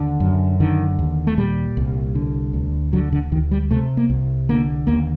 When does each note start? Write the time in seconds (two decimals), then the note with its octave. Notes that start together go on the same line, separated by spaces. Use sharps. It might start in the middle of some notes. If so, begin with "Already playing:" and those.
Already playing: D#2 D3
0.20 F#2
0.60 D3 D#3
0.99 D#2
1.27 A3
1.38 A#2 G3
1.77 C2
2.15 D3
2.54 D2
2.93 D3 F#3
3.12 D3
3.32 D2 D#3
3.51 G3
3.71 C3 A3
3.97 A#3
4.10 C2
4.49 D3 A#3
4.87 D#2 A#3